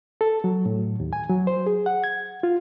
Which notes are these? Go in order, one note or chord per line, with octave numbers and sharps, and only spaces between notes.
A4
F#3
A2
D#2
G#5
F#3
C5
G#4
F#5
G#6
F4